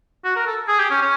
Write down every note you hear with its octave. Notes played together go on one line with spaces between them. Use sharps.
F#4
A#4
A4
G#4
G4
C#4
C#4